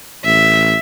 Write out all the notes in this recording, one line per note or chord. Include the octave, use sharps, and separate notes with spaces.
A1 E5